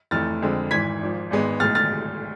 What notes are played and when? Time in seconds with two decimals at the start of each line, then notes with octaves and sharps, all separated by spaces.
0.11 F1 F2 E3 A3 F6 A6
0.42 F2 D3 G#3 C4
0.71 G#1 G#2 E3 G#6 B6
1.01 G#1 G#2 F3
1.30 G#1 G#2 G#3 B3
1.60 B1 A2 G#3 F6 A6
1.75 F6 A6